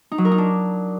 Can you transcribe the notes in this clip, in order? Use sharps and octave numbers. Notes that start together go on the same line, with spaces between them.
D#4
F#3
A#4
D#4
D4